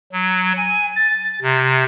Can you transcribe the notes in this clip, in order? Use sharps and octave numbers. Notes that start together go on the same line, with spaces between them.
F#3
G#5
A6
C3